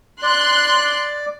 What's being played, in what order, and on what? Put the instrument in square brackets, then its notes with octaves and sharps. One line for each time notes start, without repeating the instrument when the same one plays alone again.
[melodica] D5 [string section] C6 F#6